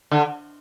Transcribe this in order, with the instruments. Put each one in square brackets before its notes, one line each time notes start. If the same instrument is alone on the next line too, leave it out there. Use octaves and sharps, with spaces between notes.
[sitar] D3